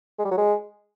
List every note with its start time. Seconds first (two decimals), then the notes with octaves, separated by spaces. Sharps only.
0.18 G#3
0.25 G3
0.31 F#3
0.37 G#3